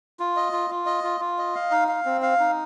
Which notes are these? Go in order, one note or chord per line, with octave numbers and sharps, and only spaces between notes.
F4
D#5
F4
F4
D#5
F4
F4
D#5
F5
D#4
F5
C4
F5
D#4